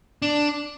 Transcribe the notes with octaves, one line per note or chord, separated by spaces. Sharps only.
D4